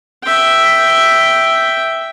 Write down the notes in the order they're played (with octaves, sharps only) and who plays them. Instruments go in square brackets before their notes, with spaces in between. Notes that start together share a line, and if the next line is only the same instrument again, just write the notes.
[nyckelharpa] E5 G5